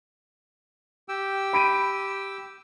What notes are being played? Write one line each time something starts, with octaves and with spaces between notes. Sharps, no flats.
G4 G5 E6
B5 D7 D#7